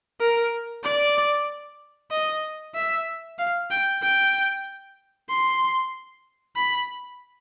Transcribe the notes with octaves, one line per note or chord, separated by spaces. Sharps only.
A#4
D5
D#5
E5
F5
G5
G5
C6
B5